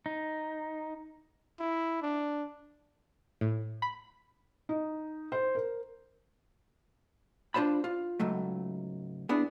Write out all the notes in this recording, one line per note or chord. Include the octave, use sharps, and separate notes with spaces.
D#4
E4
D4
A2
B5
D#4
C5
A#4
D4 F4 C5 A5 B5
F4
C#2 G#2 F#3 A3
B3 D4 E4 G#4